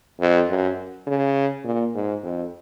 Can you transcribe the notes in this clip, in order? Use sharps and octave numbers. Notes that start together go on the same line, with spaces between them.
F2
F#2
C#3
A#2
G#2
F2